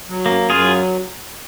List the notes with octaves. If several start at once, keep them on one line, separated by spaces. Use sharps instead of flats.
F#3
F#2 A#3
F#2
F4 G#4
F#3